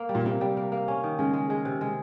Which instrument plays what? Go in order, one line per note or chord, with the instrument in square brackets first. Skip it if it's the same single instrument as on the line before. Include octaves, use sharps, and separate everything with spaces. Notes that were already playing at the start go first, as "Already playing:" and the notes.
Already playing: [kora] A#3
G3
[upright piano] A#2
[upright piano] C3 [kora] A#3
[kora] G3
A#3
A#3
C#4
D#3
[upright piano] C#3 [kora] G#3
[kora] G#3
G#3
C3
G#3